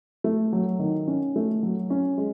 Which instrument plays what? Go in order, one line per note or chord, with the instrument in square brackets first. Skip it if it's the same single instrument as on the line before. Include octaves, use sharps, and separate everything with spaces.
[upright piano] A3
F#3
D#3
C#4
A3
F#3
C#4
G#3